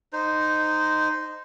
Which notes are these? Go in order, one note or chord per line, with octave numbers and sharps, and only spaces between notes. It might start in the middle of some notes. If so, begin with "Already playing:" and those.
D#4 C5